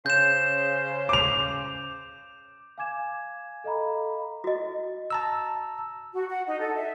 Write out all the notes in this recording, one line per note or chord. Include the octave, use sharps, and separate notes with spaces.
C#3 C5 G6 E7
D6 F7
F5 G#5 D6 G#6 E7
A4 D#5 F5 A#5 B5
F#4 D#5
A5 A#5 E6
F#4
F#5
D#4
A4
E5